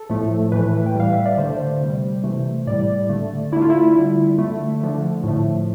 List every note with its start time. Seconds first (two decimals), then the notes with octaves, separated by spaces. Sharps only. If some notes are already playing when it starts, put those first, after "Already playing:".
Already playing: A4
0.09 A2 F3 A3
0.52 A2 E3 A3 B4
0.86 G5
0.95 A2 G3 F5
1.13 E5
1.26 D5
1.38 D3 A3 C5
1.81 C3 G3
2.24 C3 E3 A3
2.67 A2 G3 D5
3.09 D3 A3
3.52 D3 E4
3.56 A3
3.62 F4
3.70 E4
3.96 D3 G3
4.38 D3 A3
4.81 D3 F3 A3
5.24 A2 F3 A3